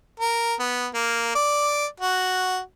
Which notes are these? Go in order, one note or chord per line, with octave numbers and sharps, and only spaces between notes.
A#4
B3
A#3
D5
F#4